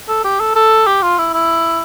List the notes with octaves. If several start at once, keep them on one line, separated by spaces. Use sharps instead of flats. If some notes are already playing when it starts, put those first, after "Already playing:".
A4
G4
A4
A4
G4
F4
E4
E4